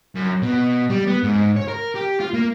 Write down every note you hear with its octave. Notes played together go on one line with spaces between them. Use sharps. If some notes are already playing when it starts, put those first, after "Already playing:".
F#2
B2
G3
B3
G#2
C#5
A#4
G4
F4
A#3